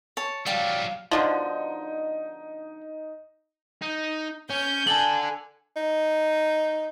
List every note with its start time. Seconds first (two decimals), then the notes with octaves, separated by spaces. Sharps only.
0.17 C#5 A5
0.47 F#3 G3 D5 F5 G5 A5
1.11 B2 D3 F3 D#4
3.82 D#4
4.50 C#4 G6
4.87 D4 A4 G#5 A5 F#7
5.76 D#4